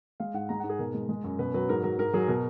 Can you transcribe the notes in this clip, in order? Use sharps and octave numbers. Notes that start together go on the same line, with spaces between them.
G#3 F5
G#2 F#5
G#3 A#5
F#5
G#2
G#4
B2 A#4
G#3
G#3
F#2
B2 B4
F#3 B4
G#2 A#4
F#3 A#4
G#2 A#4
F#3 G#4
B2 A#4